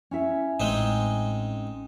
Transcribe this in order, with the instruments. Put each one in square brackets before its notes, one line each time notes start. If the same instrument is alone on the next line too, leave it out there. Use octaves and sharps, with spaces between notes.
[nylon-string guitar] C#4 E4 E5
[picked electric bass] A1 [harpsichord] G#3 C4 D#4